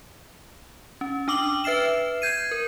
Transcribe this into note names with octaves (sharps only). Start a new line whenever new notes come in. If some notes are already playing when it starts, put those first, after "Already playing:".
C#4
D4 G5 D6 D#6 F#7 G7
B4 E5 F6 C7 E7
G6 G#6 C7 D#7
A#4